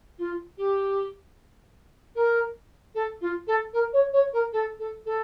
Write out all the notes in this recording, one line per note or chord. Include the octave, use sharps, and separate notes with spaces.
F4
G4
A#4
A4
F4
A4
A#4
C#5
C#5
A#4
A4
A4
A4